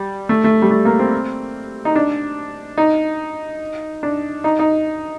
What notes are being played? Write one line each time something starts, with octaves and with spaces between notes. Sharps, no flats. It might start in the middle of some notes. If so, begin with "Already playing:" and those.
Already playing: G3
A3
A3
G3
A3
A#3
C4
D#4
D4
D#4
D4
D#4
D#4